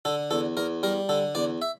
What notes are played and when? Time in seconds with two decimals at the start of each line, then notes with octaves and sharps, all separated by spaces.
0.05 D3 A4
0.31 E2 A4
0.57 E2 A#4
0.83 G3 A#4
1.09 D3 A4
1.35 E2 D5
1.62 E5